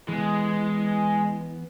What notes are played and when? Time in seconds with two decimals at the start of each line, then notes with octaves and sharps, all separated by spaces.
0.08 E3 G#3 B3